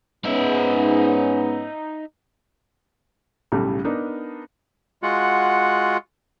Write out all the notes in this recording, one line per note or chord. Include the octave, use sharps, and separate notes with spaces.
G#2 B3 C#4 D#4 E5
B1 A2 C#3 G3
B3 D4 D#4 A#4
G#3 F4 F#4 F#5